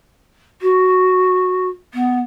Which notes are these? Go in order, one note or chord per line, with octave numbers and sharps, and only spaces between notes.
F#4
B3